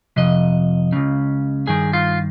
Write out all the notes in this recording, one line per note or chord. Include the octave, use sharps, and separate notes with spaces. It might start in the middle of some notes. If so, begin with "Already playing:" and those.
F2 C3 D#5
C#2 C#3
G2 D#3 G#4
F4